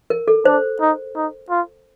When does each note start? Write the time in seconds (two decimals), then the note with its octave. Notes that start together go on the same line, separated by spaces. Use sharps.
0.10 A#4
0.28 A4
0.45 D4 C5
0.81 D#4
1.16 D#4
1.50 F4